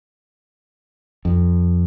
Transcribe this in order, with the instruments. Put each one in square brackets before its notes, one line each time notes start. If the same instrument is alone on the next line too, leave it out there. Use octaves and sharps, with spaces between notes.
[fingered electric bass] F2